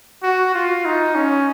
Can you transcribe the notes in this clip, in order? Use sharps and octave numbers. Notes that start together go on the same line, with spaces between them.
F#4
F4
D#4
C#4